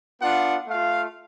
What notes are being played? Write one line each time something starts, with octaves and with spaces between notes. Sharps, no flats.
B3 D4 F4 F#5
A3 F4 F5